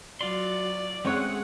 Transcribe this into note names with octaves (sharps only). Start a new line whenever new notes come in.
F#3 F4 D5 C6
G#3 A3 C4 C#4 G#4 C#5 F#5